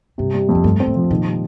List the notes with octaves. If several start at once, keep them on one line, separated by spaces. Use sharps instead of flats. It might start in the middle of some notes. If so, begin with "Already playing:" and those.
G2 C3
G3
F2
A2
G2 A3
C4
A2
F3
A#2 D#3
G3